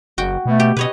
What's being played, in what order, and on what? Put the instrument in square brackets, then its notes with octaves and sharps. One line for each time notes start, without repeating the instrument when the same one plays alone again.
[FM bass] F#1 [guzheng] F#4 G5
[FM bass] B2 [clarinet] A3
[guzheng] G4
[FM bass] B2 [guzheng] B4 C#5 D#5